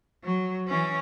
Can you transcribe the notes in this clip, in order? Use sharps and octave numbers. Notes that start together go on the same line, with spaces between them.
F#3
E3 C#4